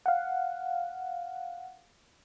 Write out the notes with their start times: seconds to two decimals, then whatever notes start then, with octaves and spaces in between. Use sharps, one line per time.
0.06 F5 F#5